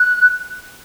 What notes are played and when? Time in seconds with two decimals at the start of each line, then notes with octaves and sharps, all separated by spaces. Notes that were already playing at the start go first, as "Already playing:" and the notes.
Already playing: F#6